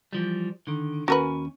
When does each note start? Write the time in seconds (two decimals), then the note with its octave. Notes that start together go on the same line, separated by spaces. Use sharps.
0.13 E3 F3 G3
0.67 D3 D#3
1.08 D#2 C#4 F#4 A#4 B4 G#5